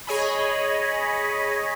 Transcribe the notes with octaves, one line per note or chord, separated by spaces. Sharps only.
G#4 C#5 D#5 G#5 B5